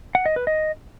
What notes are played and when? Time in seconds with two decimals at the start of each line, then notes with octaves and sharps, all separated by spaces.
0.15 F#5
0.26 D#5
0.36 B4
0.47 D#5